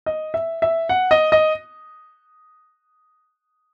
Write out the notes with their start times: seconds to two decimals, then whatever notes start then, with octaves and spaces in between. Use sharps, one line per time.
0.06 D#5
0.34 E5
0.62 E5
0.89 F#5
1.11 D#5
1.32 D#5